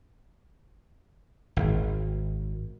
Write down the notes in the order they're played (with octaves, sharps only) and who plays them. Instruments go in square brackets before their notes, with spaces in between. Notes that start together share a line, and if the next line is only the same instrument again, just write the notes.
[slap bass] G#1